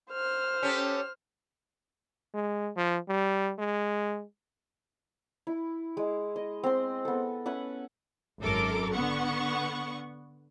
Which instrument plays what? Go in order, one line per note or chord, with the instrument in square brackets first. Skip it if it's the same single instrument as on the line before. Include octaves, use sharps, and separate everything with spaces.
[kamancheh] C5 F6
[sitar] C#4 G4 A4
[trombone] G#3
F3
G3
G#3
[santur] E4
G#3
D#5
C4 C6
B3 A4
C#4 B4 E5 F#5
[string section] G#1 F#2 A4 A#4 D6
D3 B3 F#5 C#6